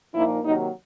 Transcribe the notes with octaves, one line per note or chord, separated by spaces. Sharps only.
A#2 F3 A#3 D#4 E4
C3 D#3 F#3 A#3 D#4